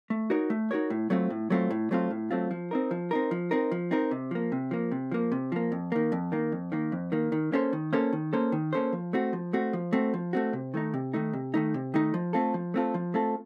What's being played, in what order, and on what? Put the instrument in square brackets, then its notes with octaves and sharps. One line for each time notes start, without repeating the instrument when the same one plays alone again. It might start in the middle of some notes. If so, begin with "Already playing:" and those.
[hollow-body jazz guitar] A3
D#4 F#4 A#4 C#5
A3
D#4 F#4 A#4 C#5
A2
F#3 A3 C4 F4
A2
F#3 A3 C4 F4
A2
F#3 A3 C4 F4
A2
F#3 A3 C4 F4
F3
C4 D#4 A#4
F3
C4 D#4 A#4
F3
C4 D#4 A#4
F3
C4 D#4 A#4
C3
F3 A#3
C3
F3 A#3
C3
F3 A#3
C3
F3 A#3
F2
D#3 A#3
F2
D#3 A#3
F2
D#3 A#3
F2
D#3 A#3
D#3
A#3 C#4 A4 C5
D#3
A#3 C#4 A4 C5
D#3
A#3 C#4 A4 C5
D#3
A#3 C#4 A4 C5
F3
A3 C4 F#4
F3
A3 C4 F#4
F3
A3 C4 F#4
F3
A3 C4 F#4
C3
D#3 A3 D#4
C3
D#3 A3 D#4
C3
D#3 A3 D#4
C3
D#3 A3 D#4
F3
A3 C4 F4 A4
F3
A3 C4 F4 A4
F3
A3 C4 F4 A4